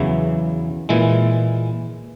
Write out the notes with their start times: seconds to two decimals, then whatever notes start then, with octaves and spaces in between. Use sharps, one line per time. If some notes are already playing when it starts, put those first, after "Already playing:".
Already playing: E2 C#3 E3 F#3 E4
0.89 A#2 E3 G#3 E4